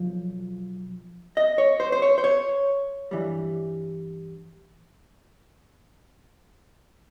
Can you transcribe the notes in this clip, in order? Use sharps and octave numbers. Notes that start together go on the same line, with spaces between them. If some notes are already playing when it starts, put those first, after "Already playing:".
Already playing: B1 F3
D#5
C#5
C5
C5
C#5
C5
C#5
G2 E3 G3